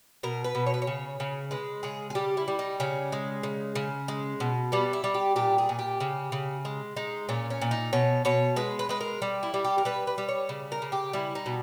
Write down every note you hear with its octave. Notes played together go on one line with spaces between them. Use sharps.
B2 A#4
B4
B2
C#5
B4
C#5
C#3
C#3
G#3 B4
C#3 G#4
G#4
G3 G4
E4
G3
D#4
C#3 C#4
G#3
C#3
C#3
G#3
B2
G3 B3
E4
G3
G4
A#2 G4
G#4
A#2
G4
C#3
C#3
G#3
G#3 D#4
A#2 C#4
C#4
A#2
D#4
B2 C#5
B2 C#5
G#3 B4
B4
G#3 B4
A#4
G3
E4
G3
G4
A#4
G3 B4
B4
G3
C#5
C#3
A#4
C#3
G4
G3 E4
D#4
B2